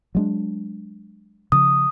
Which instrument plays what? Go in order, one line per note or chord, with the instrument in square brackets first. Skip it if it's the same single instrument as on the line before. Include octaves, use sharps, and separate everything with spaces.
[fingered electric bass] F#3 G#3 D4
[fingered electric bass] C#3 F3 [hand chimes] D#6